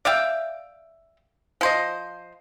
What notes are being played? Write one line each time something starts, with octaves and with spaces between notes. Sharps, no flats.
D5 E5 F5 G5
F3 C5 D#5